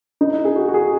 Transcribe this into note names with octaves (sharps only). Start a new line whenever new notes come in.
D#4
E4
G#4
F#4
F#4
G#4